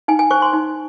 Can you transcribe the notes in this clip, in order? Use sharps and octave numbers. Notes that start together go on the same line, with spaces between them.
D#4 G#5
G#5
C5 C#6
C6
D#4